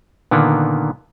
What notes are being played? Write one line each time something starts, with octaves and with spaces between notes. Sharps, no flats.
A#2 D3 D#3 A#3 B3